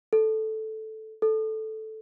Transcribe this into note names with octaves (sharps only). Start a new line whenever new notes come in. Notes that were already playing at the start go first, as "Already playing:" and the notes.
A4
A4